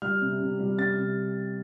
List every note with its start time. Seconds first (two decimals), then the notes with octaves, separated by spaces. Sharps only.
0.02 G3 F6
0.21 C3
0.40 C3
0.60 G3
0.79 C3 A6
0.97 C3